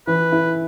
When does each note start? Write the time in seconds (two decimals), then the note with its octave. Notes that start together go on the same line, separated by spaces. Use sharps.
0.07 E3 B4
0.32 E4